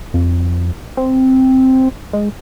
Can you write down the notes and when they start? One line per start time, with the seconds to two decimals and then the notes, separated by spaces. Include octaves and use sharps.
0.14 F2
0.97 C4
2.13 G#3